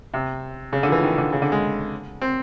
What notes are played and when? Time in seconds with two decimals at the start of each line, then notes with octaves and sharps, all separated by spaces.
0.14 C3
0.73 C#3
0.83 D3
0.88 F3
0.92 E3
1.03 D#3
1.18 D3
1.32 C#3
1.42 D3
1.52 G#3
2.21 C4